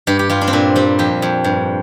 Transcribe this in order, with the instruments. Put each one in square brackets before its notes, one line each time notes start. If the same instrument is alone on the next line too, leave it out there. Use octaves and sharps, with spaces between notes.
[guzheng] G2 G4
G4
G2 F4
D4
C4
A#2 D4
G3 C4
F2 G4
F2
G2